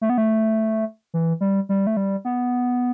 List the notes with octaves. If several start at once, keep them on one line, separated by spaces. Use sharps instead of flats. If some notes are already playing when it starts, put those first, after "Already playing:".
A3
B3
A3
E3
G3
G3
A3
G3
B3